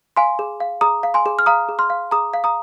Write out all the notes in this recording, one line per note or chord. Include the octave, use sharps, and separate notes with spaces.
F5 G#5 C6
G#4
F5
G#4 A#5 D#6
F5
G#5 C6
G#4
F6
F5 A#5 D#6
G#4
C6 F6
F5
G#4 A#5 D#6
F5
A#5 D#6